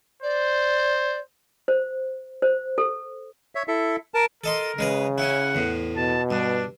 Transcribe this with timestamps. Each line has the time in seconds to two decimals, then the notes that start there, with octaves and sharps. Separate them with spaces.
0.23 C5 D5
1.68 C5
2.42 C5
2.78 A4
3.55 C#5 E5
3.68 E4 A4 E5
4.14 A#4 A5
4.44 A4 A#4 D#5 C6
4.78 C#3 G#3 B4 A#5
5.18 C#4 E4 F#5
5.55 E2 A2
5.96 B2 A5
6.31 G2 D4